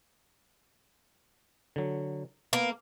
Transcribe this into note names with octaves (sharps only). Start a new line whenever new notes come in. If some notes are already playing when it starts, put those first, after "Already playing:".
D3 F#3
A#3 B3